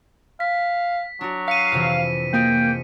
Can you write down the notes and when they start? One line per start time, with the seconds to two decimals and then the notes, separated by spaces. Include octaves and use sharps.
0.40 F5 B6
1.21 F#3 D4 F#4
1.48 F5 B6 C#7 D#7
1.72 F2 C3 E3
2.33 A#3 F4 G#4 D#5 G5